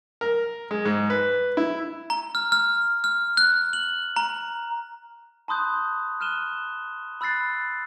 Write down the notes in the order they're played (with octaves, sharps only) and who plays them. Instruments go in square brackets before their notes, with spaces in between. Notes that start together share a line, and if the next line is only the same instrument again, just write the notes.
[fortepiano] A#4
G#3
G#2
B4
E4
[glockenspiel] A#5
F6
F6
F6
F#6
F#7
A#5
A5 B5 C6 D#6 F#6 G6
F6 F#6 D#7 E7 G7
B5 E6 F#6 A6 C7